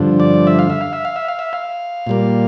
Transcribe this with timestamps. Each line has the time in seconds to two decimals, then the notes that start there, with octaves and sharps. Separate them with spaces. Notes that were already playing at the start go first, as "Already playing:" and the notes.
Already playing: G2 D3 F3
0.20 D5
0.47 E5
0.59 F5
0.70 E5
0.81 F5
0.93 E5
1.05 F5
1.16 E5
1.28 F5
1.39 E5
1.53 F5
2.07 A#2 G3 A#3